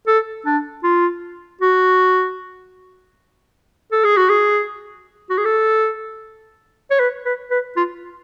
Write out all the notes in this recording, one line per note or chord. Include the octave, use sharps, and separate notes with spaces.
A4
D4
F4
F#4
A4
G#4
F#4
G#4
F#4
G#4
A4
C#5
B4
B4
B4
F4